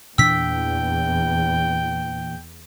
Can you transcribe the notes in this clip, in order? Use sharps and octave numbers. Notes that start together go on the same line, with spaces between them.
E2 A#2 E3 D4 G5 E6 B6